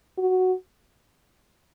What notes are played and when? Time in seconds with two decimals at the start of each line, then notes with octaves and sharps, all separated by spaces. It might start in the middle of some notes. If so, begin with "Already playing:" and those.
0.18 F#4